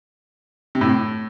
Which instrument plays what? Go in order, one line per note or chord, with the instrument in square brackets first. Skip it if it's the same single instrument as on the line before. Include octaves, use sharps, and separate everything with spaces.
[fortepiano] C3
A2